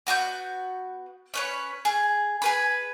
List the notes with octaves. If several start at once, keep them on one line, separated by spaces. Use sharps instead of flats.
B3 F#4 D6 G6
C#4 B4 C#5
G#4
G#4 B4 B5